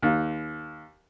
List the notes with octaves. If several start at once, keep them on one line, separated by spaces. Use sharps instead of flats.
D#2